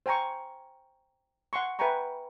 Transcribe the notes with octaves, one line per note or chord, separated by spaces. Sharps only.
C5 G5 G#5 A#5 C#6
F#5 G#5 C6 C#6
B4 E5 G5 G#5 A#5 C#6